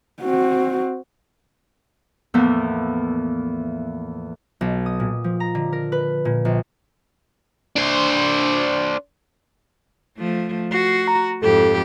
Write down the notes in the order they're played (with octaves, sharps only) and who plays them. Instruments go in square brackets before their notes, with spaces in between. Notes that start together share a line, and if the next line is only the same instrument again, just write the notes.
[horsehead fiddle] C4 F#4
[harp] E2 A2 E3 F3 A#3 B3
B1
D#6
A#2
F3
A#5
D3
A#4
B4
A#2
A#1
[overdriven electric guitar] D4 C5
[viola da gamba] F3 A3
[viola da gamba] F#4 [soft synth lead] C7
[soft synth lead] A#5
[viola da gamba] F2 G#2 G4 [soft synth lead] A4